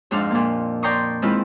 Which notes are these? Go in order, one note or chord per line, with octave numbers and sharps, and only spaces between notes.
F2 G#2 D4 F5
A#2 A#3
D5 G5 A#5 C6 C#6 D#6
D#3 G#3 C4 E4 F4 B4